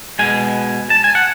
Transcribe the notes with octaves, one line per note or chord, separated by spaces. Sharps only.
B2 G#3 G#5
A5
G#5
F#5